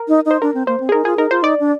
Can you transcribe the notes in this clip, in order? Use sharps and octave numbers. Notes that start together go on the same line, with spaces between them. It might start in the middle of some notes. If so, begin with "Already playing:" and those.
Already playing: A#4
D#4
D#4
C5
D4 A#4
C4
A#3 C5
C4
G#4
D#4 A#4
F4 G#4
D#4 A#4
F4 C5
D#4 D5
D4